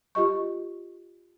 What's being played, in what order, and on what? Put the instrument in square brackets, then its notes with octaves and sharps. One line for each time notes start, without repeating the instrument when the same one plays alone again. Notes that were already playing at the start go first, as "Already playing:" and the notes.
[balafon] F4 G4 D#5 C#6